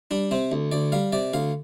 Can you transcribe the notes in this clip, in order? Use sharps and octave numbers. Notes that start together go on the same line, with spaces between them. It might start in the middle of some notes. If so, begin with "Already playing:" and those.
G3 D4
C3 C4
D2
D2 D5
G3 F5
C3 D5
D2 F5